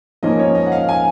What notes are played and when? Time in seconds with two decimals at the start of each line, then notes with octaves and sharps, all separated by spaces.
0.23 G#2 F3 A#3 C#4 D#5
0.39 C#5
0.55 D#5
0.66 F#5
0.72 F5
0.89 G#5